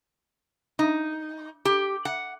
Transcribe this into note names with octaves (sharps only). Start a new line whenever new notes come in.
D#4
G4
F#5